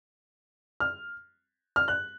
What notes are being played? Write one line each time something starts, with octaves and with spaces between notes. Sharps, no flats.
F6
F6
F#6